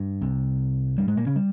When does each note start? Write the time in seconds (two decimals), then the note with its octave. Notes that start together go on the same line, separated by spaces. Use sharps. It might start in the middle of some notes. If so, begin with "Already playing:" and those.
Already playing: G2
0.21 C2 C3
0.98 G2 G3
1.08 G#2 G#3
1.17 A#2 A#3
1.27 C#3 C#4
1.36 G3